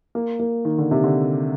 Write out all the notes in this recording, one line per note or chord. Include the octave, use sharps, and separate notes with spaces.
A#3
A#3
D#3
D3
C3
D3